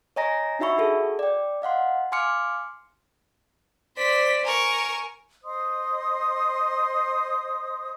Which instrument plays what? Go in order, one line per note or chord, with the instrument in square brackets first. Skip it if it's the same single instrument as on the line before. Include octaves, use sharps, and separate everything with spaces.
[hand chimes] C#5 D#5 G#5 A#5 A#6
D4 D#4 F#4 E5 B5 C#6
F#4 G#4 A4
D5 G5
D#5 F5 F#5 C6
F5 G#5 C6 D6 F6 C#7
[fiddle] C5 D5 [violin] B6
[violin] A#4 C#6 [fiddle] G#5
[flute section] C5 D#5 C6 D#6